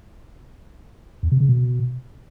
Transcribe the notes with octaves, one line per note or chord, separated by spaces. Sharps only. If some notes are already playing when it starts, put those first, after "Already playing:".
E2
C3
C#3
B2